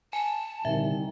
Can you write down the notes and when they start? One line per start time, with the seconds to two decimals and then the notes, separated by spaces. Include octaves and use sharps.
0.13 G#5 A5
0.65 C2 A#2 D3 D#3 E5